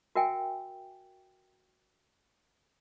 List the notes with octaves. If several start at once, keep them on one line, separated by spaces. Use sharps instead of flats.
F#4 A#4 E5 G5 G#5